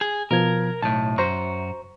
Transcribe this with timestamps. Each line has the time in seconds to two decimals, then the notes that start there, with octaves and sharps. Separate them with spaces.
0.01 G#4
0.31 B2 F3 A#4 G#6
0.82 B1 A2 A5
1.18 F#2 F#4 C5 A#5 C#6